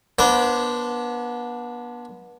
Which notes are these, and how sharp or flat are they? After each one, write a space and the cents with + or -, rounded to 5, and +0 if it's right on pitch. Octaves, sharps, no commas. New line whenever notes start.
B3 -35 D4 +0 C5 -15